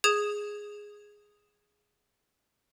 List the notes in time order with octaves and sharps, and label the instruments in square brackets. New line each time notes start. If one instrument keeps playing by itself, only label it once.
[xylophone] G#4 D#6 G#6 E7